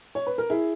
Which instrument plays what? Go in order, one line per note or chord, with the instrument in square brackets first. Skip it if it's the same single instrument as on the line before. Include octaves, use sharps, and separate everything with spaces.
[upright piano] C#5
B4
A#4
E4 G#4